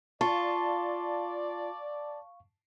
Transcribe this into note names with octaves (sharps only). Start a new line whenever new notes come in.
F4 D5 F5 A5 C#6